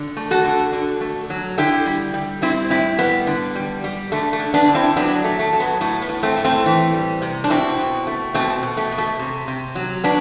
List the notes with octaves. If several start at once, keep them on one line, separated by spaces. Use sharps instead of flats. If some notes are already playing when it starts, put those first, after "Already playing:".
Already playing: D3
A3
F#4 A4
D3
D3
A3
F#3
D3 E4 G4
G3
G3
G3 C4 E4
A2 C4 E4
G3 B3
D3
G3
G3
D3 A3
A3
D3
B3 D4
D3
C4 E4
F#3 B3 D4
A3
A3
F#3
B3
A2 A3
B3
A2
A3 C4
A2
A3 C4
E3
G3
C3
D4
B2 C4 E4
B2
A3
B2 A3 C4
B2
A3
B2
A3
C3
C3
F#3
B2 B3 D4